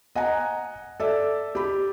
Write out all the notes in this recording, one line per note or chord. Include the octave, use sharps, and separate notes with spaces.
D#5 F#5 G#5 A#5
A4 D5 E5
G4 B5